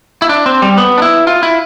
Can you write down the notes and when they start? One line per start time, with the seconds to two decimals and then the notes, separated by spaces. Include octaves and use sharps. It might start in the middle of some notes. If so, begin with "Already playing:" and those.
0.22 E4
0.29 D4
0.46 C4
0.62 G3
0.77 B3
0.98 D4
1.02 E4
1.27 F4
1.43 E4